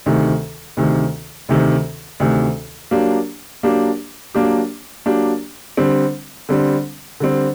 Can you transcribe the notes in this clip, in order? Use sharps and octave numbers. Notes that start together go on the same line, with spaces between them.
D2 C3 D#3
D2 C3 D#3
D2 C3 D#3
D2 C3 D#3
F#3 A#3 D4 G4
F#3 A#3 D4 G4
F#3 A#3 D4 G4
F#3 A#3 D4 G4
D3 G3 C4
D3 G3 C4
D3 G3 C4